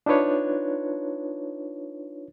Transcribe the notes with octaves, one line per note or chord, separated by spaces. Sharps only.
D4 D#4 F4 B4 C#5